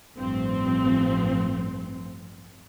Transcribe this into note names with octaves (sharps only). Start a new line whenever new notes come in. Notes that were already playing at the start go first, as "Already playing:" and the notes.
A1 G2 F3 C4